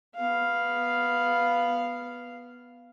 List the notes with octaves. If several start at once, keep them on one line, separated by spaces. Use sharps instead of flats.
B3 F5